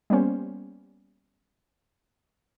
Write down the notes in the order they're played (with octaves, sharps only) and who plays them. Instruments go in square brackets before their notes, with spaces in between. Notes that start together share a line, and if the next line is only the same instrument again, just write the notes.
[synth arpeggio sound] G3 A#3 B3 C#4 C5